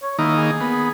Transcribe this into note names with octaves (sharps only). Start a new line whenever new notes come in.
C#5
D#3 A#3 D#4 E4
G#4
B3